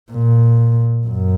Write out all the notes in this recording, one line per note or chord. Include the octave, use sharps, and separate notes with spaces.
A#2
F#2